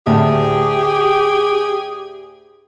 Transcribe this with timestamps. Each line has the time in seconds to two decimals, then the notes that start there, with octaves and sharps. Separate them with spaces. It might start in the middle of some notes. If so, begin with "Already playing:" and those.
0.07 D2 A2 G4 G#4